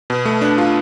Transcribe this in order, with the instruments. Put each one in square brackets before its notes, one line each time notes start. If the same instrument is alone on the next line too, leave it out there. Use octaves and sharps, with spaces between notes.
[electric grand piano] B2
A3
D4
F4